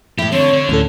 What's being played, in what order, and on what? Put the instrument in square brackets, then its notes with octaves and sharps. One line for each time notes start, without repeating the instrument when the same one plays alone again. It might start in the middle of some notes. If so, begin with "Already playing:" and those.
[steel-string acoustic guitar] A2 E4 [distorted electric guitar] G4
[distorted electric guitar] D3 [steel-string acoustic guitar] C4 [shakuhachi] C#5
[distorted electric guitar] D3
[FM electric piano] D2 A2 A4 [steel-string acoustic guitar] C#4